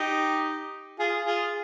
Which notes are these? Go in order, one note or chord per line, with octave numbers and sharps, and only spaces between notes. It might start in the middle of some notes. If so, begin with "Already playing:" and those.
Already playing: D#4 G4
F4 G#4
F4 G#4